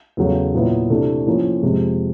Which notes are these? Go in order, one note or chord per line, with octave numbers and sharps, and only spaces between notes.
E2 C#3 F#3 A3
A#2 F#3 B3 E4
C3 E3 A3 D4
A2 F3 A#3 C#4
F2 C3 F3 G#3